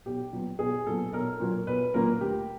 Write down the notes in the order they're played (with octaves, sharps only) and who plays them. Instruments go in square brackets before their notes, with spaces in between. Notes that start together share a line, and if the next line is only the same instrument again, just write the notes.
[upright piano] B1 G4
A#2 F#3 B3
B1 G#4
A#2 F#3 B3 A4
B1 A#4
A#2 F#3 A#3
B1 B4
A#2 F#3 A#3 A#4
D2 G4